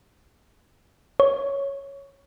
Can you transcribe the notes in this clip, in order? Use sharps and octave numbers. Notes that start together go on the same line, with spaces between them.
C#5